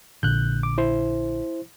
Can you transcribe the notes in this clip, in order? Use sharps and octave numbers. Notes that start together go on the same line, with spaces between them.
A#1 A#2 D3 F#6 G6
D6
E4 C5